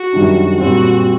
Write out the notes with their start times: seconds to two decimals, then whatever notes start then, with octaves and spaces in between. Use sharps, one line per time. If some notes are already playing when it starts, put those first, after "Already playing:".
Already playing: F#4
0.13 F#2 D#3 G3 D4
0.59 A#2 G3 C4 F#4